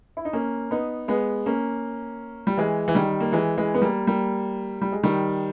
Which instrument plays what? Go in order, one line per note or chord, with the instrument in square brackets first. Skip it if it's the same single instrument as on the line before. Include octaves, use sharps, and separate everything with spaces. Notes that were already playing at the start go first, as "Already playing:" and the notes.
[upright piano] E4
D#4
A#3 C#4
B3 D#4
G#3 B3
A#3 C#4
G3
E3 G#3
E3
D#3 G3
A#3
E3 G#3
E3 G#3
B3
G3 A#3
G3 A#3
G3
G#3
D#3 G3